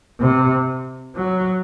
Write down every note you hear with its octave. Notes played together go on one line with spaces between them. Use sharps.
C3
F#3